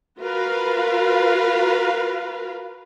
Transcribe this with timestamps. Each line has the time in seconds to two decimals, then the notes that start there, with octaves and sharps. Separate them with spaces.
0.20 F4 F#4 A#4 B4 F5